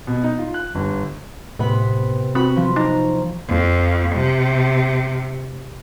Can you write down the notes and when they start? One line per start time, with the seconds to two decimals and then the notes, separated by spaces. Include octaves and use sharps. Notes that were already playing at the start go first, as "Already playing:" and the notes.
0.07 B2
0.23 D#4
0.39 F4
0.54 F#6
0.75 G1
1.59 A2 C3 B3 B5
2.35 C4 F#4 B5
2.57 F3
2.76 D#4 A#5
3.48 F2
4.15 C3